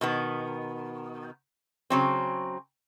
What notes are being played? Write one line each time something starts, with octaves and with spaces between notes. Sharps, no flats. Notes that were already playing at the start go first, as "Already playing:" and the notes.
B2 D#3 B3
C#3 F#3 C4